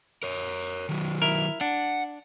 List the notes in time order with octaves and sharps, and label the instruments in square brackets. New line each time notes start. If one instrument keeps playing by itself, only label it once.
[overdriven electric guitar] A#4 C#5
D#3 F#3
[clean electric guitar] E4 A#4
[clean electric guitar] D4 [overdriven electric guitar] F#5